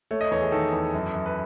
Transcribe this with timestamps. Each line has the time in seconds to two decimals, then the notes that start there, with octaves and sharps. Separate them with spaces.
0.11 A3 C#5
0.21 D#5
0.31 E2 C#5
0.42 G#4
0.52 D#3 A4
0.73 E2
0.94 F#2
1.14 F#2
1.26 B4